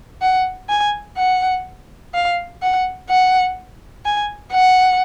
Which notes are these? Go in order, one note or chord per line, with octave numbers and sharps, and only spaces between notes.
F#5
G#5
F#5
F5
F#5
F#5
G#5
F#5